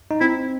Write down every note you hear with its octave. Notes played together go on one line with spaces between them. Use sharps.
D#4
C4 E4